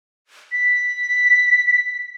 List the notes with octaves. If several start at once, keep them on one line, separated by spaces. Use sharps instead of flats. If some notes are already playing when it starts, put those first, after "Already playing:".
B6